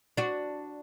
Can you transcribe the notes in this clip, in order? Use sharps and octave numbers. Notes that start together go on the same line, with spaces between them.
D4 F#4